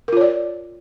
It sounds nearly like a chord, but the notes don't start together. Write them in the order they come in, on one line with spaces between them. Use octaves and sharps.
A#4 F4 C#5 D5